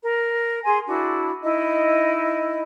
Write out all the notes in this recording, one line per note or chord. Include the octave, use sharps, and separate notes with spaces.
A#4
G#4 G#5 C6
D4 E4 F#4
D#4 E4 D#5